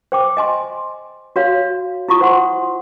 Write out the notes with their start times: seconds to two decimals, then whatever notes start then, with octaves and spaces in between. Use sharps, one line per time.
0.12 C5 G5 D6
0.37 D#5 G#5 C6
1.36 F#4 C#5 F5
2.09 E4 F4 C#6 D#6
2.21 C5 F#5 C6